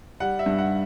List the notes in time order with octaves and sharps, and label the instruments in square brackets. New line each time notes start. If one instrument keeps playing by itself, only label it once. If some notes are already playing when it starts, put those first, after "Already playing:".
[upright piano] G3 F#5
E5
G2
F#5